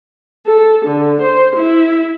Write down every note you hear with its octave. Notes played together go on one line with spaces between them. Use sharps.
A4
D3
C5
E4